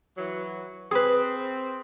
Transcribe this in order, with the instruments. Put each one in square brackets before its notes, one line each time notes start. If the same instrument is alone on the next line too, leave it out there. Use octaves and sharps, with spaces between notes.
[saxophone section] E3 F#3
[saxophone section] C4 [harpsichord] G#4 B4